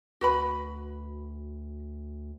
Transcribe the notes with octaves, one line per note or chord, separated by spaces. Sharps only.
D2 F#4 B4 B5